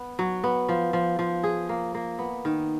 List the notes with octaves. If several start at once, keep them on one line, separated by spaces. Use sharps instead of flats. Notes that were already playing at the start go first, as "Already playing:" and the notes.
Already playing: B3
F#3
B3
F3
F3
F3
G#4
A#3
A#3
B3
D#3